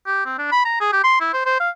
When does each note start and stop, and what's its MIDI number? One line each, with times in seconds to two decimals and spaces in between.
0.07 0.24 67
0.26 0.35 60
0.39 0.49 62
0.52 0.61 83
0.65 0.77 82
0.81 0.90 68
0.93 1.00 67
1.04 1.17 84
1.21 1.33 64
1.33 1.42 72
1.46 1.60 72
1.60 1.70 77